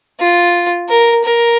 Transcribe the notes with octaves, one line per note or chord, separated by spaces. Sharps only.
F4
A#4
A#4